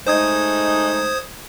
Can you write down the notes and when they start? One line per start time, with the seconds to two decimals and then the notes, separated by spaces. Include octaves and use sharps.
0.07 G#3 A3 D#4 C5 D#6 G#6